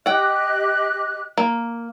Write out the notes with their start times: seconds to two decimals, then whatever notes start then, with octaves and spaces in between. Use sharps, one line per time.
0.06 G4 D#5 F#5 G5 F#6
1.38 A#3